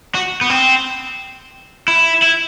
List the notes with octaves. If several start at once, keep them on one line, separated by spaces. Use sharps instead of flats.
F#4
B3
C4
E4
E4